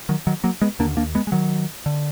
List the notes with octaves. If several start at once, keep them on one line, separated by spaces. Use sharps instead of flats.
D#3 F#3
D#3 F#3
F#3 A#3
G#3 B3
D#2 D3 A#3 D4
A#3 D4
G#3 B3
G#3
D#3 F#3
D3